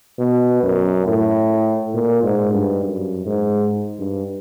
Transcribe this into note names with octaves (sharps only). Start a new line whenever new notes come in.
B2
F#2
A2
A#2
G#2
G2
F#2
G#2
G2